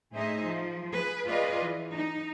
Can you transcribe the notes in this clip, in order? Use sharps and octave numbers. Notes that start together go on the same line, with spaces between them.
A2 D#4 G#4 C5 D#5 E5
F3
G#4 B4
F4 G#4 B4 D5 D#5
E3
D#4